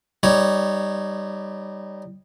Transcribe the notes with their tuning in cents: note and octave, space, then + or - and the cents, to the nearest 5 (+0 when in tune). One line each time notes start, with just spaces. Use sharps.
G3 +0 D#4 -15 C#5 +0